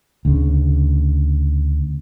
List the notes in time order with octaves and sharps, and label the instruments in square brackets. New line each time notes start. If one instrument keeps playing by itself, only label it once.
[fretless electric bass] D2 C#3